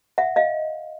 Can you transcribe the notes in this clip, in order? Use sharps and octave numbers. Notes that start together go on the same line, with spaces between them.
E5 F#5
D#5 F5